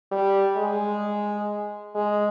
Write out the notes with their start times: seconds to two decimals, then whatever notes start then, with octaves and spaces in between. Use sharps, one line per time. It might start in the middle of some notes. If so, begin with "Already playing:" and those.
0.12 G3
0.57 G#3
1.95 G#3